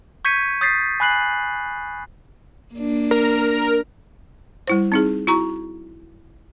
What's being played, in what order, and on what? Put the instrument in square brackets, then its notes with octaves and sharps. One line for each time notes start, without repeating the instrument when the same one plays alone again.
[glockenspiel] C#6 G6 G#6 B6 C#7 D#7
D#6 G6 A6 B6 C7
G#5 B5 F#6 C7 F#7
[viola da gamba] A#3 D4
[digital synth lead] A#4
[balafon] G3 E4 C5
C4 D#4 G#4
E4 F#4 A#5 C#6